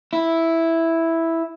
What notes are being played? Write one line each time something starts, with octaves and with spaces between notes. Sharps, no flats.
E4